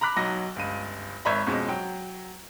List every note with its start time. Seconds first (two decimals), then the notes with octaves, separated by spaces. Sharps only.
0.01 A#5 B5 D6 F#6 B6
0.16 B1 F#3 D#4 A#6
0.56 G1 C#2 D#7
1.25 G#1 C#5 E5 A#5 B5
1.47 F2 B2 G#3 C#4
1.68 F#3 G5